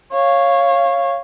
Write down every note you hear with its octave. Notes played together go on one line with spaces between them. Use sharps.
C#5 F5